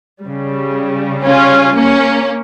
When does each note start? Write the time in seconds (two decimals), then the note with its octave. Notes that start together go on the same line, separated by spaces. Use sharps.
0.23 C#3 G3
1.24 C#4 F4
1.75 A#3 C#4